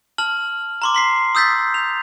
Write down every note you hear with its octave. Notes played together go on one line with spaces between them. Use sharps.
A5 F6 F#7
A#5 C6 D6
C6 B6 C7
D#6 E6 G6 A6 B6
F7